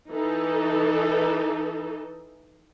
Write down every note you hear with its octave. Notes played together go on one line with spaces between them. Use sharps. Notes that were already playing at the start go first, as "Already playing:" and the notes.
E3 D#4 A4